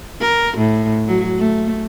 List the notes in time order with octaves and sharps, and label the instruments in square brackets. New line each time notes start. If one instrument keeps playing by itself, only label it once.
[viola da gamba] A#4
A2
F#3
A3